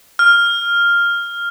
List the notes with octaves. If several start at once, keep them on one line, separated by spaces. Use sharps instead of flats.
F6